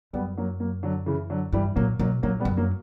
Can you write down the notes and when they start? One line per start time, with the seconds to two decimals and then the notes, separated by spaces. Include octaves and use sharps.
0.13 F#2 G3 B3
0.37 F#3 A#3
0.60 F#3 A#3
0.83 D3 F#3
1.06 C#3 E3
1.30 D3 F#3
1.53 G2 E3 G3
1.76 A#2 F#3 A#3
1.99 B2 F#3 A#3
2.23 A#2 F#3 A#3
2.40 G3 B3
2.45 F#2
2.57 F#3 A#3